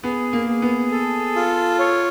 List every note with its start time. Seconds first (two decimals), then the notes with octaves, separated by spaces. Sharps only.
0.03 B3 G#4
0.33 A#3
0.48 G#4
0.62 B3
0.92 A4
1.35 F4
1.79 C#5